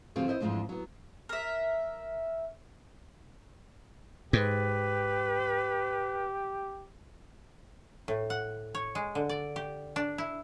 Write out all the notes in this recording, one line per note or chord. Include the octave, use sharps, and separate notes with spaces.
D3 F3 C4 F4 F#4 G#4
E4 C5 D#5
F2 G#2 E3 F3 G#3 D4
F#3 B3
A#4 E5
G#2 G4 B4
A2
F#5
C#5
G#3
D3
D5
G4
D4
E4